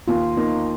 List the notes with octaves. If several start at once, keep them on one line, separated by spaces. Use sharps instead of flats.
D#2 F4
A#3 D#4